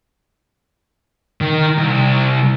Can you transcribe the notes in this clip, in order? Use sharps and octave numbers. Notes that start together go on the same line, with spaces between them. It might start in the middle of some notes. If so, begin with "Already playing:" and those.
D#3
C2